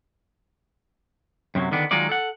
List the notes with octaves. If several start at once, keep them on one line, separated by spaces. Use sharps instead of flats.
F#2 C3 D#3 F#3
D3 D#3 B3 D4
D#3 F#3 G#3 D#4 F4 D5
A4 F#5